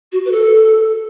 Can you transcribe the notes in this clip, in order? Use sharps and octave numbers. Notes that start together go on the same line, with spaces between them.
F#4
B4
A4